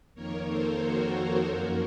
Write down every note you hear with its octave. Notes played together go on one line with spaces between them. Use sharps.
F2 D#3 A#3 A#4 C#5
A4 C5
F#4 A#4
F#2 F3 A#3